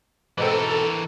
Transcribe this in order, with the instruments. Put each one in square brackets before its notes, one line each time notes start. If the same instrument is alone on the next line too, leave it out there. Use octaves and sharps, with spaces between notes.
[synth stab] G#2 B2 C4 [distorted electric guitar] E3 A#4 [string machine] A4